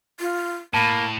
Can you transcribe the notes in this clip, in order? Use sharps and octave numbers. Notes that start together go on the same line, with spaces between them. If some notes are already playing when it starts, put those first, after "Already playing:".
F4
A2 A#3 A5 B5